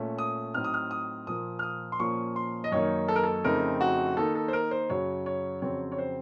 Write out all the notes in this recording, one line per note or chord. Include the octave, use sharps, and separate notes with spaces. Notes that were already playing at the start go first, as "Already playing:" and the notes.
Already playing: A#2 A3 C#4
D#6
A2 F#3 C4 D#4 F6
D#6
F6
D#6
A#2 F3 A#3 D#6
F6
D#6
C6
A#2 F3 A#3 C#4 C#6
C6
D#5
F#2 D#3 A#3 D#4 C#5
A4
A#4
A4
F2 C#3 A3 C4 D#4 A#4
F#4
D#3 A#3 D#4 A4
A4
C5
A#4
C5
F#2 C#3 F#3 C#5
C#5
F2 C#3 F#3 C4 C#5
C#5
C5